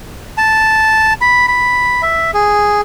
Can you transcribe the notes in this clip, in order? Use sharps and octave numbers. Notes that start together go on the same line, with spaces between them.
A5
B5
B5
E5
G#4